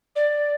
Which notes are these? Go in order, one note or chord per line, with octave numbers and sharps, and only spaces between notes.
D5